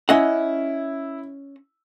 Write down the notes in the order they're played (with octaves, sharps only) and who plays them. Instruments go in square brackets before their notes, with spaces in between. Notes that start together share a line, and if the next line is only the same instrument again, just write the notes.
[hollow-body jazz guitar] C#4 D#5 F#5 [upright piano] E4